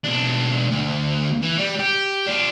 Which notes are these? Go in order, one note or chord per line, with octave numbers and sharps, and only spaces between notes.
B1 D4
D2
E3
G3
G4
D4 F4